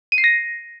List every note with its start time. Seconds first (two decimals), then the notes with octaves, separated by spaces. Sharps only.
0.12 D#7
0.18 C7
0.24 A#6